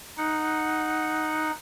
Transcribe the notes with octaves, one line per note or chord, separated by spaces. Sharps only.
D#4 F#5